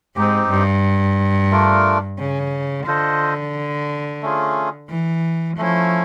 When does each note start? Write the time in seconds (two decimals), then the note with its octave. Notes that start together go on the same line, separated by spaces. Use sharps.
0.16 G#2 C4 D#4 G4
0.50 G2
1.51 A3 D4 F4 A#4
2.19 C#3
2.86 D3 F4 A4 C5 D#5
4.22 A3 C#4 F4 G#4
4.90 E3
5.57 F3 A3 C#4 E4